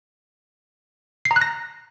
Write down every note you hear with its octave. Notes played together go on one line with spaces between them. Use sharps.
C7
A#5
F#6
A#6